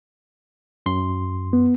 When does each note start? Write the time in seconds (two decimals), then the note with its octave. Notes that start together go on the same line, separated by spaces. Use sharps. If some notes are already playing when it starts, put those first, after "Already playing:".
0.86 F#2 C6
1.53 B3